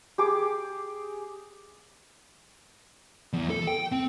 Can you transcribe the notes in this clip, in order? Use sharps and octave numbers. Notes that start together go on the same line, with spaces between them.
G4 G#4 D6
E2
A4
G5
C4